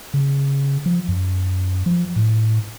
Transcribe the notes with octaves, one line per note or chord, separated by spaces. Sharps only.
C#3
F3
F#2
F3
A2